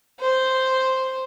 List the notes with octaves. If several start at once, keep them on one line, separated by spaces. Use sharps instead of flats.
C5